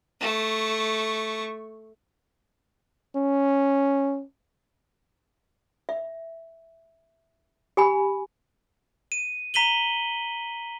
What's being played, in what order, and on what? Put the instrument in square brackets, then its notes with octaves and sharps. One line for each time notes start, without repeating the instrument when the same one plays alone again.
[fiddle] A3 C#6
[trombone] C#4
[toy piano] E5
G4 G#5 B5
[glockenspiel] D#7
A#5 B6 D#7 F#7 G7